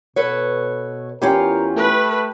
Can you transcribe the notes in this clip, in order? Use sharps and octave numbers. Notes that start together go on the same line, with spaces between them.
B2 A4 B4 C#5
E2 C#4 F4 G4 A#4 G5
A3 B4